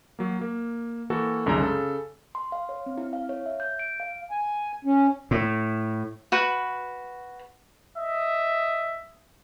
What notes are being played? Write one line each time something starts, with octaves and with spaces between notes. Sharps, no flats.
F#3 A#3
A#3
E3 A#3 F#4 A4
C2 F#2 D3 G#3 D#4 A#5
C#3 A4
C6
F5
C#5
C4
E4
F5
C#5
E5
G6
D7
F5
G#5
C#4
A2
F#4 B4
D#5 E5